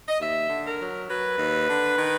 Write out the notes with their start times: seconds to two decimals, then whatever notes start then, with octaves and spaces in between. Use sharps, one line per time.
0.09 D#5
0.20 D#2 E5
0.50 D3
0.65 A#4
0.79 F#3
1.09 F#3 B4
1.38 D#2
1.68 D3
1.98 D#3